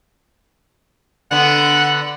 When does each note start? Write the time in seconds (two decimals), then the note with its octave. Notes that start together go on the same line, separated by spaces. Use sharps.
1.31 D3 B3 F#5